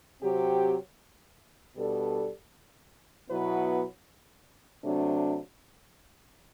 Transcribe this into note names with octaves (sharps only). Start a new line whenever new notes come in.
C3 F#3 C4 G4
B2 G3 D4 A4
B2 F#3 B3 E4 B4
C3 F#3 A3 D4